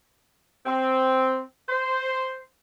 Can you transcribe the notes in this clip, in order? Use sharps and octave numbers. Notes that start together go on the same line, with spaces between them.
C4
C5